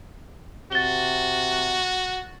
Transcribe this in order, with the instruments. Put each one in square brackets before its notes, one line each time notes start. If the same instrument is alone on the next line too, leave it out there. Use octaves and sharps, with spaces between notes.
[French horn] C3 [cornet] F#4 [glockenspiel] A6 G7